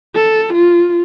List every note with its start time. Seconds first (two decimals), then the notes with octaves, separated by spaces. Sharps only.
0.15 A4
0.53 F4